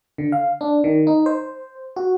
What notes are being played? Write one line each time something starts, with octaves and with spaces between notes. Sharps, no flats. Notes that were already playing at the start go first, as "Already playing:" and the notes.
D3
F5
D4
D#3
D#4
C5
F#4